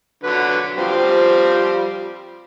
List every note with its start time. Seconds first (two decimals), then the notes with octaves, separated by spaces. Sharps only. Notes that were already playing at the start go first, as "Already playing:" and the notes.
0.24 D3 F#3 B4
0.78 F3 G3 C4